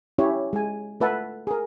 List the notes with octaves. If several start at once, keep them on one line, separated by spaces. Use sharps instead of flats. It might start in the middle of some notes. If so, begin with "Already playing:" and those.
C#4 E4 G4 C#5
G#3 G#5
A3 F4 B4 E5 F#5 A5
G#4 A#4